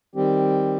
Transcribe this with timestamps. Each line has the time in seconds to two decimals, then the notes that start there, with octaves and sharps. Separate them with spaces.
0.15 D#3 G3 C4 G4